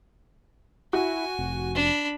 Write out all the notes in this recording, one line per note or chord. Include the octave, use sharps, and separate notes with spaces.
E4 F#4 G#5
F1
D4 B5